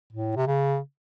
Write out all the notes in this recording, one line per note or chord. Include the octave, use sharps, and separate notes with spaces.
A2
C3
C#3